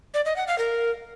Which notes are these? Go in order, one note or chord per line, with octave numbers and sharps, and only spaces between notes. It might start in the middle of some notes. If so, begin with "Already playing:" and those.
D5
D#5
F#5
F5
A#4